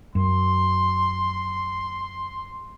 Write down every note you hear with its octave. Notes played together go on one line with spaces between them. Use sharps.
F#2 C6